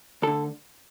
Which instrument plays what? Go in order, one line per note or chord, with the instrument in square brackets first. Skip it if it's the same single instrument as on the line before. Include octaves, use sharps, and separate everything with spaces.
[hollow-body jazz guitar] D2 D3 A4